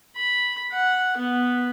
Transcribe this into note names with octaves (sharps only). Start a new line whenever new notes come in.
B5
F#5
B3